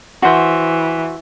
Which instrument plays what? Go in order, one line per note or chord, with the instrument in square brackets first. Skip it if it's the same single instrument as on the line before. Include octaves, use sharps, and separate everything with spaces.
[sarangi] E3 [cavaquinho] F#4 C5 E5